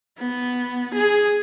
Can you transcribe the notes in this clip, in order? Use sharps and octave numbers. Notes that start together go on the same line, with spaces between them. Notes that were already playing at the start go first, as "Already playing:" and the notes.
B3
G#4